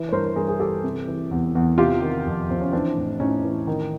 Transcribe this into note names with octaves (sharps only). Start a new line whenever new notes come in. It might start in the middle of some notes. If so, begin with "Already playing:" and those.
Already playing: E3
C#5
G2 A#4 C5
G2 G#4 A#4
G#4
E3 G4 A4
C3
E3
E2
E2
C3 F4 G4
D#3
F2
F2 C4
C#4
E3 C4 D4
A2
A2 C#4 D#4
E3
D#3